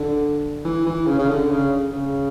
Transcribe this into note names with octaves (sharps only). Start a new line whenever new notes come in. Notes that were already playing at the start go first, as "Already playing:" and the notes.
Already playing: D3
E3
E3
C#3
C#3
D3
C#3
C#3